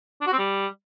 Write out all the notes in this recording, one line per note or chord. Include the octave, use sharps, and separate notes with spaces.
D4
F#4
C4
G3